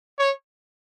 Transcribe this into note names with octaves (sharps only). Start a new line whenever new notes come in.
C#5